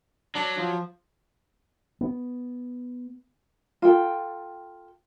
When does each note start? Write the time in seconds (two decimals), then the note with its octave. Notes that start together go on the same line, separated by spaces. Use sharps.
0.35 F#3 D4
0.57 F3
2.01 B3
3.82 F4 A4 G5